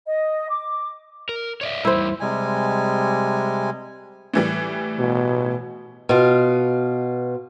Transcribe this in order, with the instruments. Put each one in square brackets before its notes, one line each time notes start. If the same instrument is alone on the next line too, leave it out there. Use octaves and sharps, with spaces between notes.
[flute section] D#5
D6
[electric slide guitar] A#4
C#5 D5 E5
[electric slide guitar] E2 G3 [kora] E4 C5
[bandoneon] C3 G3 G#3 G#5
[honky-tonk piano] A2 E3 G3
[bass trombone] B2
[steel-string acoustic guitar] B2 F4